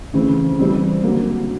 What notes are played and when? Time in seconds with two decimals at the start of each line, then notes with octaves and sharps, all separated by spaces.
0.13 C#3 E3 A3 C4
0.59 E3 G3 C4
1.03 D3 F#3 A#3